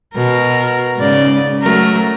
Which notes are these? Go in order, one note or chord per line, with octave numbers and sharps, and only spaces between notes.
B2 A#4
G#2 C#3 D5
F#3 A3 A#4